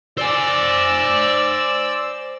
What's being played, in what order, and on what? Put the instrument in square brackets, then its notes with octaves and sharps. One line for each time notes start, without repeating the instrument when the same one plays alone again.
[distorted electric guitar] C5 G#5 [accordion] D5 E6